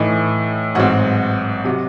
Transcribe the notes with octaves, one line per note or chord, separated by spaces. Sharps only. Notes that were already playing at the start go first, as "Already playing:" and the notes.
Already playing: A2 E3 A3 D#4
A1 G#2 F#3 C4 F#4 F#5
C3 F#3